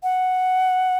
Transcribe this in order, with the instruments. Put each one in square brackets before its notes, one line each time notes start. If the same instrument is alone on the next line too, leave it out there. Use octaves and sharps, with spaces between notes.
[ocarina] F#5